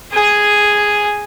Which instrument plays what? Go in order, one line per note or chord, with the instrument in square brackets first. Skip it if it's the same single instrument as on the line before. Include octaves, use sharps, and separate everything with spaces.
[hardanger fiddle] G#4 G#5